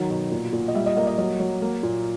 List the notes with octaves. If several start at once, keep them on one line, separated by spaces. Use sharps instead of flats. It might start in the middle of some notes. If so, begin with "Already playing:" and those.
Already playing: D#3 F#3
B2
A#2
A#2
D#5
G3 E5
D#5
A#3 D#5
D#5
F#3 D#5
F#3
A#3
A#2